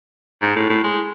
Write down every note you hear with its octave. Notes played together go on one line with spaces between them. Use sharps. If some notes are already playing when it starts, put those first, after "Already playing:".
G#2
A2
A2
G#3